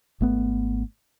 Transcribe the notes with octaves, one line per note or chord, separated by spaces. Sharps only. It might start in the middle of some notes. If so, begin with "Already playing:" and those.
G#1 A3 B3